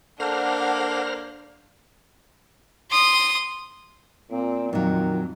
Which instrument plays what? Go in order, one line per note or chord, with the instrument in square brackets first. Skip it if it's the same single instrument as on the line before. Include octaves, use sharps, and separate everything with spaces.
[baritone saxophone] A#3 [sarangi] D4 [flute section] A4 F#5 A5 [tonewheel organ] C5 A#5 F6
[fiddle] C6 D#6
[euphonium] A#2 [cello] C4
[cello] F2 [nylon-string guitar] A#2 F#3 [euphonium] D#3